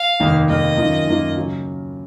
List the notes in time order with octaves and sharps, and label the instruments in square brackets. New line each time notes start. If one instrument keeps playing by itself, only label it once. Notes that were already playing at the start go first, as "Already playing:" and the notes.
Already playing: [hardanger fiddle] F5
[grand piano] F1 D#2 D#3 A#3 D#4
[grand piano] F1 D#2 D#3 A#3 D#4 [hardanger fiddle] D#5
[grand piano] F#2 D#3 A#3 F4
F#2 D#3 A#3 F4
C#3 F#3